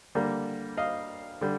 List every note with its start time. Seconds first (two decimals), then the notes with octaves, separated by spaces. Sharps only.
0.15 D3 G3 A#3
0.77 D#5 F5
1.41 D3 G3